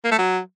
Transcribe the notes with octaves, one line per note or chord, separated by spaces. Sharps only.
A#3
A3
F#3